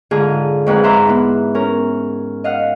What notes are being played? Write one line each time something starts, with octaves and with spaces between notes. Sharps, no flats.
G#2 D3 F4 G#4
F2 G#2 C4 B4
B4 E5 A#5 C6 D6 E6
B3 E4
C#4 A#4
D#5 F5 F#5